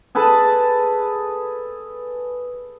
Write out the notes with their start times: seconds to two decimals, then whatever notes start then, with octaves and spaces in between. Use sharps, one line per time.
0.15 G#4 A4 B4 A5